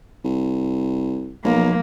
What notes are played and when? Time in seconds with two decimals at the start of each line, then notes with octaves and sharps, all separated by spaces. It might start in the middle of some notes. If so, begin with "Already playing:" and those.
0.24 C2
1.44 B1 F3 A#3